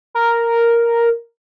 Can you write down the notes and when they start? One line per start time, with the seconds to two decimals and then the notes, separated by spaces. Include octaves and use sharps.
0.15 A#4